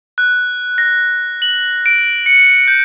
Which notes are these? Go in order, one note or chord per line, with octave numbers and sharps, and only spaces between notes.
F#6
A#6
F#7
D7
C#7
G6